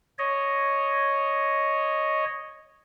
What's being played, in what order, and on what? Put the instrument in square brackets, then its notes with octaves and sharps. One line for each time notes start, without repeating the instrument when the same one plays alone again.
[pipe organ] C#5 D#5